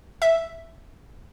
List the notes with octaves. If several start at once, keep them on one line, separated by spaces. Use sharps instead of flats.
E5